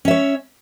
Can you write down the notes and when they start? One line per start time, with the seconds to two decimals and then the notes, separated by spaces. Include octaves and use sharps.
0.05 C#4
0.08 E5
0.11 C#5